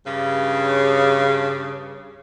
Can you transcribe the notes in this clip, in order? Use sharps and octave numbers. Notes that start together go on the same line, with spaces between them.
G2 C#3